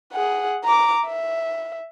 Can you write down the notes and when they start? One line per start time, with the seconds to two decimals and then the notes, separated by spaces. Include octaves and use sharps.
0.13 G#4 F#5
0.64 A#5 D6
1.05 E5